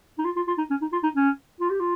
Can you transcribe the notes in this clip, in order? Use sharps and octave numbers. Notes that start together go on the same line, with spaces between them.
D#4
F4
F4
F4
D#4
C#4
D#4
F4
D#4
C#4
F4
G4
F4